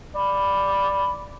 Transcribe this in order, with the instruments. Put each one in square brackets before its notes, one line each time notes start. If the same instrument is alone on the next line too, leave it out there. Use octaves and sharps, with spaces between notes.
[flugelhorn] D5 [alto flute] B5